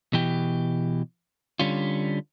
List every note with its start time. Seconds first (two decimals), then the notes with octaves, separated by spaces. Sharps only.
0.13 B2 E3 G4
1.60 D3 G3 C#4 F4